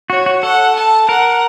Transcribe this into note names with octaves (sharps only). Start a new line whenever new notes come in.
F#4 C#5
F#4
A4 F#5
A5
A#4 F#5